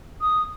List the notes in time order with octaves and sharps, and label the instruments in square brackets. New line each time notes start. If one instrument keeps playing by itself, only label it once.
[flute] D#6